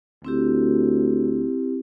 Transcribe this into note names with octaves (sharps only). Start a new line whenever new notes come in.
D2 C4 E4 G4